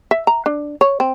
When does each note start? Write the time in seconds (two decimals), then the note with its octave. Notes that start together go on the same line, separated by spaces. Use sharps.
0.11 E5
0.27 A#5
0.46 D4
0.81 C#5
1.00 C4